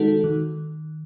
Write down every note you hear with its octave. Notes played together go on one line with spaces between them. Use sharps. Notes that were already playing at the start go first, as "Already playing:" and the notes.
Already playing: D#3 G#3 D#4 F#4 A4
D#3